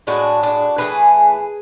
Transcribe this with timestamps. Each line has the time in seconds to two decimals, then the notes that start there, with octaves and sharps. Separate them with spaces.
0.07 A2 G#3 D4 F#4
0.43 D4 F#4
0.78 A2 E3 A3 G#4 B4